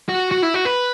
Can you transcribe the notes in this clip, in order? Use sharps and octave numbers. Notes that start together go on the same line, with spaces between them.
F#4
F#4
E4
F#4
B4